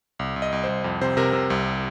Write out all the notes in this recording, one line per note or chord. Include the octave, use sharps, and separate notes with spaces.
C2
C2
D#5
C2
C5
C2
F2
C3 C5
C3 A#4
C3
C2